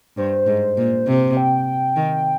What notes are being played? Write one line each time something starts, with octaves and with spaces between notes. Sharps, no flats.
G2 C5
G#2
A#2
C3
G5
D#3